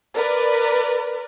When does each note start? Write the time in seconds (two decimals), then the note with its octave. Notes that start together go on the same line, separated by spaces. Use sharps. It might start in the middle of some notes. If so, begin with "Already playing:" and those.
0.15 A#4 B4 D5